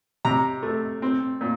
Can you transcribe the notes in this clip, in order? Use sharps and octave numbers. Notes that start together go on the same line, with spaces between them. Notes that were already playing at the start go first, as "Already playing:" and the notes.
C3 A#5
A3
C4
A#2